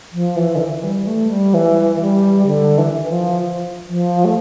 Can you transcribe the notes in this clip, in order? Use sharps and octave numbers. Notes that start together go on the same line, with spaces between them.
F3
E3
D3
E3
G3
A3
G3
E3
G3
D3
E3
F3
F3
A3